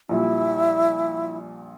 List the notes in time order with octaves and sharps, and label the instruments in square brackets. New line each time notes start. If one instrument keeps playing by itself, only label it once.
[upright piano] A#1 A#2 G3 [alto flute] E4